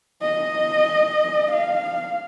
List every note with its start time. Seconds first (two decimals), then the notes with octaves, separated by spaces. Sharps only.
0.22 D#5
1.51 F5